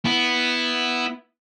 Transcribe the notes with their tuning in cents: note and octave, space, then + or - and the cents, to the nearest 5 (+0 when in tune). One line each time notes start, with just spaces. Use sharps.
B3 +0 E4 +0